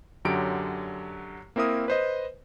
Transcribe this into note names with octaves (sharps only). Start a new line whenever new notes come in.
F#2 D3 F#3 G4 D7
A#3 C4 E4 A#4 D#6
B4 C5 D#5